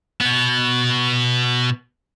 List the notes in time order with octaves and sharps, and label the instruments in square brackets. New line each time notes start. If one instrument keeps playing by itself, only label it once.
[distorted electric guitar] B2 B3